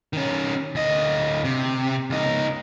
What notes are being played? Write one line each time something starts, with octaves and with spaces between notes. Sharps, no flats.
D#3 C#4
D2 D#5
C3
C#2 D#4